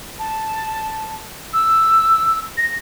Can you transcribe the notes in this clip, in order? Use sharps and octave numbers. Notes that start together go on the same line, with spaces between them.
A5
E6
A#6